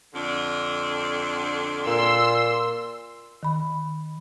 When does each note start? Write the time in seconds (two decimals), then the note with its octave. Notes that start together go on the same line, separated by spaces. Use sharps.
0.14 F2 D3 D4
1.87 A#2 C6 E6
3.43 D#3 B5